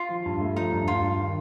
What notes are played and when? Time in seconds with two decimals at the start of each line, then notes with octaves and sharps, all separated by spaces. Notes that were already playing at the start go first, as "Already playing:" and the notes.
Already playing: F4
0.09 F3
0.25 G2
0.40 A3
0.56 F3 D#4
0.72 G2
0.87 G2 F4
1.04 G2
1.19 D#3